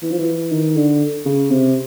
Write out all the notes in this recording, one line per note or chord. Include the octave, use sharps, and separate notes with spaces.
E3
F3
E3
D#3
D3
C#3
C3